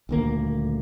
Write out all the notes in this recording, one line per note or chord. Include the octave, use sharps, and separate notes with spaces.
D#1 D2 A#3